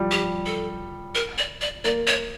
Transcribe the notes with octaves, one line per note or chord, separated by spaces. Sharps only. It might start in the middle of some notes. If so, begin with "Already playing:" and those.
Already playing: F3 G3
G4
A4
A#4
D5
D5
A#3 D5
C#5